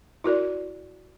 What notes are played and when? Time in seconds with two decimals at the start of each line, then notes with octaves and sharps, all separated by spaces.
0.24 E4 F#4 A#4 D5